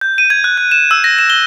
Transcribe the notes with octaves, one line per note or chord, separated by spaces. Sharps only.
G6
D#7
G#6
F#6
F#6
E7
E6
A#6
E7
G7